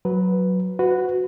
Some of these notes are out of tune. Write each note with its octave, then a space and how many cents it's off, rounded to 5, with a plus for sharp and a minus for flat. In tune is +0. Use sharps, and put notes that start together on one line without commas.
F#3 +0 B4 +0
F#4 -5 B4 +20